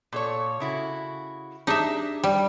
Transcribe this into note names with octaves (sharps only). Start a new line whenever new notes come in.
A#2 A4 C#5
C#3 E4 F#4
D4 D#4 G4 G#4 E5
G3